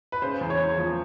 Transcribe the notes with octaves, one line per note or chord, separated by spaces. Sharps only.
B4
C#3 C5
E2
C#5
E2
F3